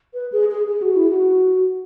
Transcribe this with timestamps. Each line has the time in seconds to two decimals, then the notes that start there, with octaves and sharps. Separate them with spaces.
0.14 B4
0.32 G#4
0.51 G#4
0.68 G#4
0.82 F#4
0.96 E4
1.10 F#4